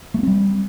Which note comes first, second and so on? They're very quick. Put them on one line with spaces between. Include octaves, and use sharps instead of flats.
A3 A#3 C4 G3